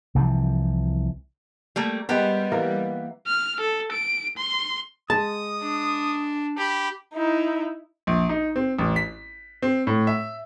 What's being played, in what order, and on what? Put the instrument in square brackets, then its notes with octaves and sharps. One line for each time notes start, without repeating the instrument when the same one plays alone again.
[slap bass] C2 C3 E3 F3
[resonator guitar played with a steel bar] G3 A3 A#3
[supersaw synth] G3 [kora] G#3 A#4 [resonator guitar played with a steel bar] B3 G4
[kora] E3 A#3 A#4
[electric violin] F6
A4
D7
C6
[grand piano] G#3 [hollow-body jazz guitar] A5 [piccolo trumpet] D#6
[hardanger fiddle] D4
[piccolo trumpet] G4 [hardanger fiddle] B5
[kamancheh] D#4 E4
[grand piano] A#1
D#4
C4
A1
B6
C4
A2
E5